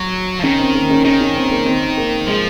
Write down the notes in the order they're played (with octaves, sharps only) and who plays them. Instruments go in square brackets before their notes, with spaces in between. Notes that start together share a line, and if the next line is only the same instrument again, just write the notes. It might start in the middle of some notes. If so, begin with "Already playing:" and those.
Already playing: [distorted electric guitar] F#3
F3
[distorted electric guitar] D#3 [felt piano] C#4
[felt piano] C4
A#3
C#4
[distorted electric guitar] D#3 [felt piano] C#4
[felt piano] C#4
C4
A#3
C4
A#3
[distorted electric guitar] F3 [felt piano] G#3